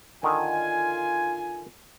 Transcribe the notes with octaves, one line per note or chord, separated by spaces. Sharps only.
D3 D#3 F4 G#5